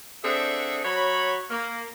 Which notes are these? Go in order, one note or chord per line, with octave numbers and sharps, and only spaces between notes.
C4 D4 G#4 A4 E5 F#5
F#3 C#5 B5
A#3